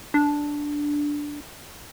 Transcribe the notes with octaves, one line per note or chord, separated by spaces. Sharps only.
D4